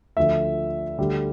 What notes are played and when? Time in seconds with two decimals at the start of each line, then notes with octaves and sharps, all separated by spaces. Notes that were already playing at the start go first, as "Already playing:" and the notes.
0.17 D2 D3 F3 E5
0.98 D2 D3 G3